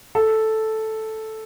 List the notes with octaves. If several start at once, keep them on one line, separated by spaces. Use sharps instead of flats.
A4